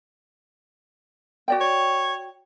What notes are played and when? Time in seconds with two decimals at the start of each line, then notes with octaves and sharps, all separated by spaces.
1.48 F#4 D5 G5
1.60 C#5